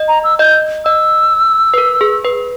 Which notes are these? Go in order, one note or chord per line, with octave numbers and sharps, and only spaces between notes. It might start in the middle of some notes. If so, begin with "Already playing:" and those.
Already playing: D#5
A#5
E6
D#5 G6
D#5 E6
B4
A#4
G#4
B4